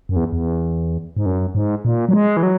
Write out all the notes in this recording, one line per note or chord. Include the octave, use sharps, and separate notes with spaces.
F#2
E2
E2
G#2
F#2
G#2
A#2
F#3
G#3
E3
F#3